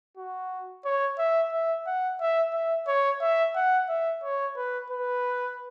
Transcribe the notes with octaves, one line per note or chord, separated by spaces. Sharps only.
F#4
C#5
E5
E5
F#5
E5
E5
C#5
E5
F#5
E5
C#5
B4
B4